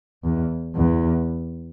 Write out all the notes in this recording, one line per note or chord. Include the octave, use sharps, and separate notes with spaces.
E2
E2